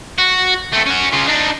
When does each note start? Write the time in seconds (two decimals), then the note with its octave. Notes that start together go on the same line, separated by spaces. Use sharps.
0.18 F#4
0.72 A3 C4
0.86 C#4 F#4
1.12 C#3 F4
1.27 D4 D#4